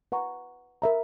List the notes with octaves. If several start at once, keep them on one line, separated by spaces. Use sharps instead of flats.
B4 F#5 A#5 C#6
A#4 E5 A#5